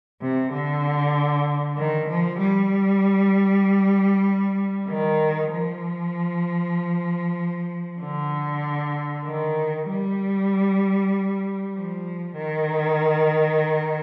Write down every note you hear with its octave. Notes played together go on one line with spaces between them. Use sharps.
C3
D3
D#3
F3
G3
D#3
F3
D3
D#3
G3
F3
D#3